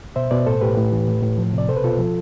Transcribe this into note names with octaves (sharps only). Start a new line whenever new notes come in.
B2 C5 E5
B2 B4 D5
A2 A4 C5
A2 G4 B4
A2
E3
A2
A2
F3
C3 D5
B2 A4 C5
B4
B2 F4 A4
F3